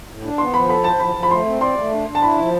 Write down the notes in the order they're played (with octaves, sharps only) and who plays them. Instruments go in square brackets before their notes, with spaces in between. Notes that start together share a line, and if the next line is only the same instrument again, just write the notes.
[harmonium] A2
D4
[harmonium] B3 [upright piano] C6
[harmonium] F3 [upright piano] B5
[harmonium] A4 [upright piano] B5
[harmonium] C5 [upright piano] A5
[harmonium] F3 [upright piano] B5
[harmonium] F3
[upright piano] B5
[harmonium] A3 [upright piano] C6
[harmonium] C4
[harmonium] D5 [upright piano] C6
[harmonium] A3
D4
D4
[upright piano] A5
[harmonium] E4 [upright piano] B5
[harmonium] F3